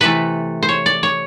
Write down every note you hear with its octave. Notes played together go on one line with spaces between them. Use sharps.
C3 E3 A3 B4
C5
C#5
D5
C#5